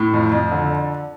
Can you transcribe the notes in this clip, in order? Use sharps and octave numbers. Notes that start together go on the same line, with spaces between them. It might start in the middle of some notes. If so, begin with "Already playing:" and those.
Already playing: A2
F2
F2
D3